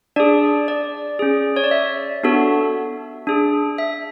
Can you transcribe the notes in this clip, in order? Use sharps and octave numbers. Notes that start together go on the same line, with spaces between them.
D4 G#4 D5
D5
C#4 G#4
C#5
D5
E5
B3 D4 F#4 A4
D4 G#4
E5